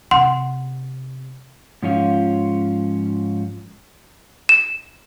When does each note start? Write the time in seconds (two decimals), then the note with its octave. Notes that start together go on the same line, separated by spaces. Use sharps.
0.11 C3 F#5 C6
1.82 G#2 F3 C#4 F4
4.49 E7